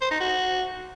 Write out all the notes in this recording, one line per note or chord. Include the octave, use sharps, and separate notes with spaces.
C5
D#4
F#4